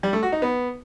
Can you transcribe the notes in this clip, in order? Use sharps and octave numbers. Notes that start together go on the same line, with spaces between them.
G3
A3
F#4
D#4
B3